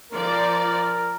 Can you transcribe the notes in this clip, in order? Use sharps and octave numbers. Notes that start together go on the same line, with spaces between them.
F3 A#4 D5